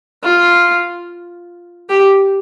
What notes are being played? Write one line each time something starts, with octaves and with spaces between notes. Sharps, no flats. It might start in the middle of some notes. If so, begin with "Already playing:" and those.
F4
G4